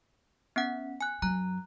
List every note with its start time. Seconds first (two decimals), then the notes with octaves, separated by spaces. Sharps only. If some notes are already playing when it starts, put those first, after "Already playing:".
0.56 B3 C#4 F#5
1.01 G#5 F#6
1.22 F#2 F#3 A#5 F#6